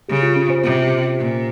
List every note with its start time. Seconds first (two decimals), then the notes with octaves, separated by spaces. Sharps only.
0.09 C#3 G4
0.22 F4
0.36 C#4
0.50 C5
0.64 C3
1.19 A#2